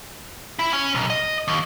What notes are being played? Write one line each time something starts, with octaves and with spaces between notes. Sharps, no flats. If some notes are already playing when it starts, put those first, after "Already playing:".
E4
C#4
B1
D#5
D#2